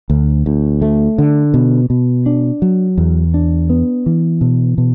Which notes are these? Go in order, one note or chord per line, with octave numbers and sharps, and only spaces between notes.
D2
D2
A3
D3
B2
B2
D4
F#3
E2
D4
B3
E3
B2
B2